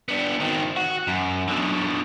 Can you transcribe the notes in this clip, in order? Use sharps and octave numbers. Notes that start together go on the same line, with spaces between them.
B3 D4
D#3 C4
F#4
F#2
B2 D3